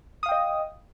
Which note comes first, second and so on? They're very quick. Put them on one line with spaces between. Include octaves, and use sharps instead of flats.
D#6 F5 G5 D#5